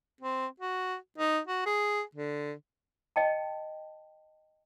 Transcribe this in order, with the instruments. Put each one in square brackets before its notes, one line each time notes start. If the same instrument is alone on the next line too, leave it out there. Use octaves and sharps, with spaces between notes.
[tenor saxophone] C4
F#4
D#4
F#4
G#4
D3
[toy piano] D#5 G5 A5